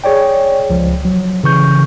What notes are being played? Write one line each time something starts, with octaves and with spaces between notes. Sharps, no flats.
G#4 C#5 D5 G5
C#2 F3
F#3
C#3 E3 C#6 G6